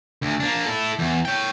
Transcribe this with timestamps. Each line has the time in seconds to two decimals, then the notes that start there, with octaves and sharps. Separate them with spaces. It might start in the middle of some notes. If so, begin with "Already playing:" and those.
0.22 D2
0.40 A#3 D4
0.66 E4 A4
0.99 E2
1.25 C#5 G5